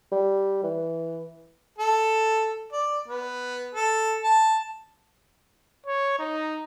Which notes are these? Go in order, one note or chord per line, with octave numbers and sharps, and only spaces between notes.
G3
E3
A4
D5
B3
A4
A5
C#5
D#4